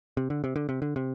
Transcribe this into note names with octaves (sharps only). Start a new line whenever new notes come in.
C3
D3
C3
D3
C3
D3
C3